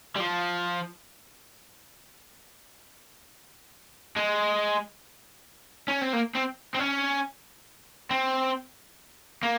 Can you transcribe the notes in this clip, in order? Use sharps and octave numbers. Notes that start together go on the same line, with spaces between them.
G3
F3
G#3
C#4
C4
A#3
C4
C4
C#4
C4
A#3